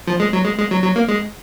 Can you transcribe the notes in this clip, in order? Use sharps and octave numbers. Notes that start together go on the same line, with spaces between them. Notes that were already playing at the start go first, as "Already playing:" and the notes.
F3
G#3
F#3
G#3
G#3
F#3
F#3
A#3
G#3